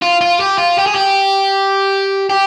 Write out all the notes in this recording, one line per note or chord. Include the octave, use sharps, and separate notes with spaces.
F4
F4
G4
F4
G4
G#4
G4
G4